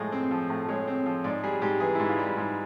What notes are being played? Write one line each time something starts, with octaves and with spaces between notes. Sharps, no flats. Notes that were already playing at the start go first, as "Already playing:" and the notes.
Already playing: A2 F3 G#3
C4
F3
A2
G#3 C#5
C4
F3
G#2 D5
G3 G#4
G#2 G4
E3 G#4
E4
G#2
F4
G3
G#2